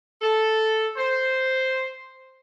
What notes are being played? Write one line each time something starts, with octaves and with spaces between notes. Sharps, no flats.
A4
C5